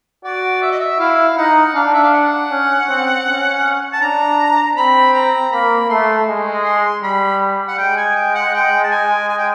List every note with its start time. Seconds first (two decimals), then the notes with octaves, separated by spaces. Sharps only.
0.24 F#4 D5
0.62 E5
0.71 D#5
0.80 E5
0.99 E4 F5
1.37 D#4 F#5
1.74 D4 F5
1.93 E5
2.03 F5
2.13 F#5
2.51 C#4
2.88 C4
3.26 C#4
3.93 A5
4.01 D4 A#5
4.77 C4 B5
5.14 A#5
5.52 A#3 B5
5.89 A3 C6
6.28 G#3
6.64 C6
7.02 G3 B5
7.68 F#5
7.78 G#3 G5
7.97 G#5
8.15 G5
8.35 F#5
8.54 G5
8.84 A5
8.91 G#5
9.29 G#5
9.38 G5